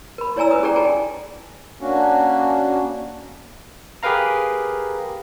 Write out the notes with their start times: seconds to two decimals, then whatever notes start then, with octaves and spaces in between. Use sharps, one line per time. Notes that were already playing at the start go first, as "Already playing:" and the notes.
0.18 A#4 B5
0.36 E4 C#5 D5 G#5 A#5 E6
0.51 C#4 F4 B4 D#6
0.63 G#4 A4 D5 F#5 G5 A#5
0.76 D#4 F4 D5 G#5 A5
1.81 A#3 C#4 D4 F#4
4.03 G4 G#4 A#4 B4 F5 A#5